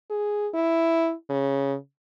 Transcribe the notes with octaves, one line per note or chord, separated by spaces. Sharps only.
G#4
E4
C#3